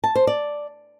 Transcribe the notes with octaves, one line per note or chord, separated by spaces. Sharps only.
A5
C5
D5